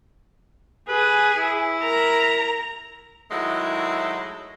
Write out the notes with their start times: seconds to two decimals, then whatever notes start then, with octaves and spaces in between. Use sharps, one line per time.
0.88 G#4 B4
1.37 E4
1.83 A#4 A#5
3.31 D#3 F#3 G#3 A3 E4